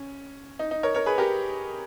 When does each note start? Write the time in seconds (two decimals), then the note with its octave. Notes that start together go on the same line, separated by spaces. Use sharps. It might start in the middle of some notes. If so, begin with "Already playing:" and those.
Already playing: C#4
0.59 D#4
0.71 D#4
0.83 A#4 C#5
0.95 A#4 C#5
1.06 G#4 B4
1.18 G4 A#4